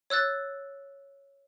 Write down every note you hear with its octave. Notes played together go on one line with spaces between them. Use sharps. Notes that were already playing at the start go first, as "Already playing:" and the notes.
C#5 E6 F#6 A6